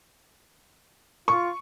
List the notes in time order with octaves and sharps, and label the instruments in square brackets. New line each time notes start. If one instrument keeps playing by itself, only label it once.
[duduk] F4 [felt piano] C#6